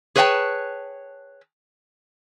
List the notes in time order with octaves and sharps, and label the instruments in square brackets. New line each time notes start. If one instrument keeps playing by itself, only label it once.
[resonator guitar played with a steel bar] G#4 B4 C#5 D#5 G5 A5